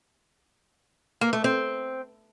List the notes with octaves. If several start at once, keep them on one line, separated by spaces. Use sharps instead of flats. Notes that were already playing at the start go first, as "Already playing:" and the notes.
A#3
A3
C4